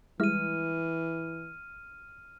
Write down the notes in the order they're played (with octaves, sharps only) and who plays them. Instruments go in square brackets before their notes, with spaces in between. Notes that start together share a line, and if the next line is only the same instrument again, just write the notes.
[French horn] E3 [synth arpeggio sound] G3 G#3 E4 [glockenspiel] F6 D#7